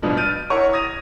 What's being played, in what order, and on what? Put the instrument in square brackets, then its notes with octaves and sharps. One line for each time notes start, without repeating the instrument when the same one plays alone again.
[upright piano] G2 B2 F3 B3 D4
F6 G6 A6 D7 D#7
E4 A#4 C#5 F#5 C#6
D#6 G#6 A#6 D#7 F7